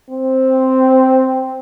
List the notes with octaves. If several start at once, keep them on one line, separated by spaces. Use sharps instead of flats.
C4